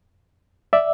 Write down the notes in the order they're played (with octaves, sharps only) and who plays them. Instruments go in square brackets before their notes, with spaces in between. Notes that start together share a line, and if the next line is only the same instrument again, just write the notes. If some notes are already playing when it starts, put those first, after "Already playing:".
[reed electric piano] D5 E5